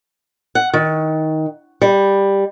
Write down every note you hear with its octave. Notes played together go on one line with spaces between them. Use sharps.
F#5
D#3
G3